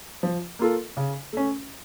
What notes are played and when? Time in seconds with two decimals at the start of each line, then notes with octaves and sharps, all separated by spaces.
0.23 F3
0.59 A#3 F4 A4
0.97 C#3
1.33 A3 C#4